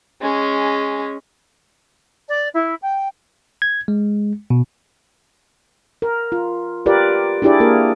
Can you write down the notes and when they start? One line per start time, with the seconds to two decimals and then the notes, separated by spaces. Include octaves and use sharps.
0.21 G#3 C#4
2.28 D5
2.55 E4
2.82 G5
3.62 G#6
3.88 G#3
4.50 B2
6.02 A#4
6.32 F4
6.86 F4 G4 A#4 B4 D5
7.42 D4 E4 G4 G#4 D5
7.60 A#3 G#4 A#4